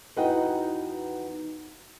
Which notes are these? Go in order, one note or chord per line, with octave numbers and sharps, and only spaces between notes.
E2 D#4 F#4 B4 D#5 G5